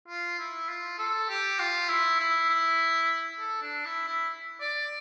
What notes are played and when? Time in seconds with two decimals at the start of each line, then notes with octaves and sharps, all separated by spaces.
0.08 F4
0.39 E4
0.69 F4
0.98 A4
1.29 G4
1.59 F4
1.89 E4
2.20 E4
2.49 E4
3.39 A4
3.62 D4
3.85 E4
4.08 E4
4.60 D5